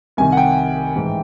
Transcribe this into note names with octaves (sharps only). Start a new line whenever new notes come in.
C2 C3 D#3 G#5
F#5
G5
A1 G#2 E3